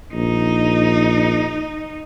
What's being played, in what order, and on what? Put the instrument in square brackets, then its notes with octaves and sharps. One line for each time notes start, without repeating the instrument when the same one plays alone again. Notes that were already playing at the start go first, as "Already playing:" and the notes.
[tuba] A#1 [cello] D#4